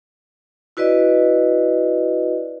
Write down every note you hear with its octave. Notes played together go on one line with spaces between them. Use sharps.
E4 F#4 B4 D5 D#5